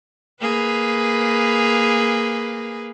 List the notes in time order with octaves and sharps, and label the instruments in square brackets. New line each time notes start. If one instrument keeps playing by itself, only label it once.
[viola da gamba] A#3 G#4 B4